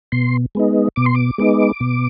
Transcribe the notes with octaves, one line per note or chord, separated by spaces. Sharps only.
B2 C6
G#3 B3 D#4
B2 D6
C6
D6
G#3 B3 D#4
B2